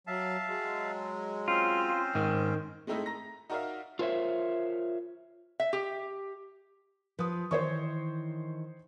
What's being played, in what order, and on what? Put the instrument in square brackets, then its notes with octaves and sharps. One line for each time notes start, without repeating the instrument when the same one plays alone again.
[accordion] F#3 [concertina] E5 F5 A5
[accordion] F#3 G#3
[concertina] C4 C#4 C5 [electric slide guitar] F4
[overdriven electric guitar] G#2 [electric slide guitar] D#3
[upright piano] G#3 A3 C4 D#4 E4 A4
A#5 A#6
D#4 F#4 A#4 D5 E5 F5
[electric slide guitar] F4 A#4 C5 C#5 E5
[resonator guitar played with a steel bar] E5
G4
[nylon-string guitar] F3 [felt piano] B4 D#6
[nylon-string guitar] D#3 E3 [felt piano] C5 C#5 C#6